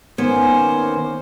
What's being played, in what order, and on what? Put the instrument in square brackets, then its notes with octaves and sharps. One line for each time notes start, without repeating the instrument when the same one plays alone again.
[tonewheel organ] D#3 A#3 C#4 [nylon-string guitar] B3 [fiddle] C5 [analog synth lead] G#5